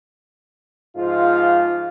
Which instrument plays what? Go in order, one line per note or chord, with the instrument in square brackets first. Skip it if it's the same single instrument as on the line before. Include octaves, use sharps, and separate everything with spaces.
[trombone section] G#2 F3 F4